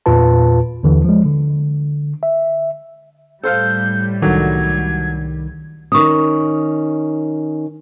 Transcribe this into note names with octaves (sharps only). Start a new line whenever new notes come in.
E2 A#2 F4 B4 A5
D#2 D3 E3
F3 G#3
D3
E5
A2 G3 A4 C5 F5 G6
C2 D3 D#3 F#3 G#6
D#3 C#4 C#6 D#6